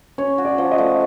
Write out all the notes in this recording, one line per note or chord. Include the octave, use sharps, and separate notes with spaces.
C#4 C#5
F#4
D5
F3
D#5
A3